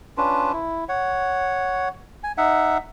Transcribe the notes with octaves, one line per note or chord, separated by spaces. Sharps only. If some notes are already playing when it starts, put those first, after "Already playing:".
C#4 D4 F4 B4
E4
C#5 F#5
G#5
D#4 E5 F#5